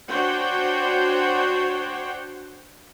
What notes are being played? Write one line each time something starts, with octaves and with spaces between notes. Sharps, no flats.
D4 F#4 C5 C#5 F#5 G5